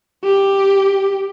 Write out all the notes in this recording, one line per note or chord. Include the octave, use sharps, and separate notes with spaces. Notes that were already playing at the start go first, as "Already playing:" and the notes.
G4